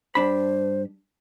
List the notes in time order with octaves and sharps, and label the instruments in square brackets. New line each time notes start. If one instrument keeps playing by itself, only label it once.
[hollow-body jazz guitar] G2 D4 B5 [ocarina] C5